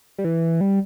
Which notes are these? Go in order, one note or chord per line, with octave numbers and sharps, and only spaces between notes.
G3
E3
G3